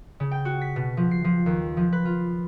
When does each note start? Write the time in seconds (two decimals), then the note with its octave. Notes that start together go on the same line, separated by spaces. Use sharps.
0.20 C#3
0.31 G5
0.45 F#4
0.61 B6
0.76 B2
0.97 F3
1.11 C7
1.24 F3
1.46 D#2
1.77 F3
1.92 B4
2.05 F4